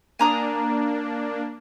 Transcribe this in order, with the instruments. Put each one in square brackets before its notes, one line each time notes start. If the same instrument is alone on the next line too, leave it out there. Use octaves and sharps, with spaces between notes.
[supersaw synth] A#3 D4 [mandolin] G#5 A#5 D#6